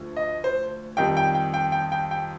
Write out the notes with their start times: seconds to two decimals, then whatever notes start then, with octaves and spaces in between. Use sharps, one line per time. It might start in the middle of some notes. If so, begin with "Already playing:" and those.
Already playing: D2 D3 F3
0.16 D#5
0.44 C5
0.97 F2 D#3 G3 G5
1.17 G5
1.35 G5
1.54 G5
1.72 G5
1.92 G5
2.11 G5